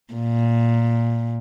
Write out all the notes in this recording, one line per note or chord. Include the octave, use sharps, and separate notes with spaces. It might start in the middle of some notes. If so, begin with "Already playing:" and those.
A#2